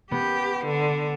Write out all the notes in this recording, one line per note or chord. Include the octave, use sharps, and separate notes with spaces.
B3 G4
D3